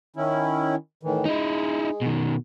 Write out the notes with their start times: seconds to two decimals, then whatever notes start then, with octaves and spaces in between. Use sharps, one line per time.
0.16 D#3 C#4 E4
1.03 A2 D#3 E3
1.25 G#3 D#4 E4
2.02 B2 D#3